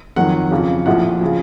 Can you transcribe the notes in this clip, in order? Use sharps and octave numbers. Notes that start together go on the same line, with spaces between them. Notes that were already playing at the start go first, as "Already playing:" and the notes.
F2 D#3 F#3 F#5
F2 C#3 F3
A#1 A2 F3 F#5
C#3 F3